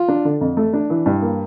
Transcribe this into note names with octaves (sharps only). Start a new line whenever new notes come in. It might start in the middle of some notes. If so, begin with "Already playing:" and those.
Already playing: F4
D4
D3
F2
A3
D4
E3
G2
A#3